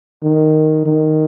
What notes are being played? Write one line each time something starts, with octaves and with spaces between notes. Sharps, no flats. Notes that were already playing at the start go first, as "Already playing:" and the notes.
D#3
D#3